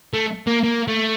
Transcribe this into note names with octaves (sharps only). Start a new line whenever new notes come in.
A3
A#3
A#3
A3